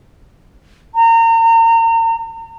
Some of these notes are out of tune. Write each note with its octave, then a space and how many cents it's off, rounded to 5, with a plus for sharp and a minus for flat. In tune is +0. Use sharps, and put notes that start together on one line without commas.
A#5 -35